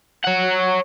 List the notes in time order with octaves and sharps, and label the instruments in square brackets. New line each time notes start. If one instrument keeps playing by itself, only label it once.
[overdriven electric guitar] C#5 F#5